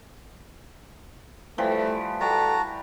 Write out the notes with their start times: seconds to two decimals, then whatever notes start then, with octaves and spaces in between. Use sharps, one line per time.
1.58 E3 F3 G3 A3
2.21 G3 F#4 A4 A5 A#5